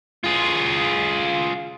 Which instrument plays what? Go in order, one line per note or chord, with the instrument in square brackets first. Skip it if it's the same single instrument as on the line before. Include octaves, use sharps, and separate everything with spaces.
[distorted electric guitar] F4 G#4